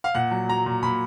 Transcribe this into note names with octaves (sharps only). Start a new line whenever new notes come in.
F5
A#2 F#5
F#3
F#3 A#5
A#2
A#2 B5